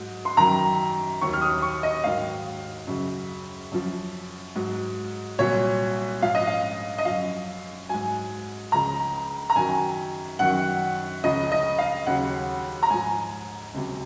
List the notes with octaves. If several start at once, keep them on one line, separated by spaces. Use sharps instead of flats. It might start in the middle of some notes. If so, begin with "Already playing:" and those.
Already playing: G#2 F#3
C6
F#2 D#3 F#3 A#5
D#2 D#3 F#3 C#6
F6
D#6
C#6
D#5
G#2 D#3 F#3 F5
F#2 C#3 F#3
F#2 F3
G#2 F#3
C2 A#2 F#3 C#5
G#2 F3 F5
D#5
F5
D#5
F#2 F3 F5
G#2 F#3 G#5
C#2 C#3 F3 A#5
A#5
F#2 D#3 F#3 G#5
F#2 D#3 F#3 F#5
C#2 C#3 F3 D#5
D#5
F5
D#2 C#3 F#3 F#5
A#5
G#2 F3 G#5
C#2 C3 F#3